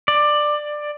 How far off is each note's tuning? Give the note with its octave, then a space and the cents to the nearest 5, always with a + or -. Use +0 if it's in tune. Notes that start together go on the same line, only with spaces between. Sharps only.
D5 +15